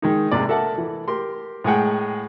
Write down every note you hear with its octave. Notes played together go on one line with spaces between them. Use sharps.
D#3 G#3 D#4
A#1 G#2 C3 D5
A4 A#4 E5 F#5 A5
E3
G4 A#4 C6
A2 G#3 G#4 F#5 G5